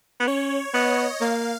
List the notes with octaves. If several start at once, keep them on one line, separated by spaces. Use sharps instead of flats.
B3
C#4 C#5
B3 D#5
A#3 F5